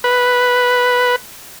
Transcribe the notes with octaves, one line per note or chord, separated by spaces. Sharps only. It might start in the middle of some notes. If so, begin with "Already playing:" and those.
B4